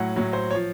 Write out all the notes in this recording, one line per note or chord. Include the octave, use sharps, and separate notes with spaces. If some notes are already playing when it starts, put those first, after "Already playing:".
Already playing: A2 F#3 F#5
A2 F#3
C5
C#5
F3